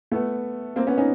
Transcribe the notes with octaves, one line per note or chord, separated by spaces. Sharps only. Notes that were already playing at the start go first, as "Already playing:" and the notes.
A3 B3
A#3 C4
B3 C#4
C#4 D#4